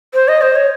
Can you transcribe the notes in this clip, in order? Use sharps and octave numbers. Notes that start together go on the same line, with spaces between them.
C5
D#5
C5
C#5